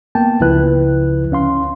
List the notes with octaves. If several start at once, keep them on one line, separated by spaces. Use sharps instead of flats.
A#3 B3 G5 A5
C#2 C#3 F3 E4 B4 F#6
D2 C#4 F5 C6